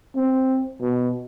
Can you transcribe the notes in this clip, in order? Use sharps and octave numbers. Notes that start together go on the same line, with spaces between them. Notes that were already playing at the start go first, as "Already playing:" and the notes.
C4
B2